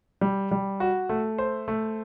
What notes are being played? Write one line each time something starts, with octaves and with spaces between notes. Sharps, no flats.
G3
G3
F#4
A3
C5
A3